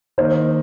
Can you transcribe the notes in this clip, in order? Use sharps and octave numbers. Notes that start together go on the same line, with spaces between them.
D#3 A#3 D#4 C5